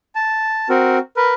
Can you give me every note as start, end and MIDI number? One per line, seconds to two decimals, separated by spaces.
0.15 0.68 81
0.69 0.98 60
0.69 0.98 66
0.69 0.98 70
1.17 1.34 70
1.17 1.34 71